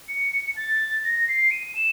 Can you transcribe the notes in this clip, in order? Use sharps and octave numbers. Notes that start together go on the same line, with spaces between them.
C#7
A6
A#6
C7
D#7
E7